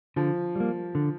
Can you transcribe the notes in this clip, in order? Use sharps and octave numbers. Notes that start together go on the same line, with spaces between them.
D3 F3
G3 A#3
D3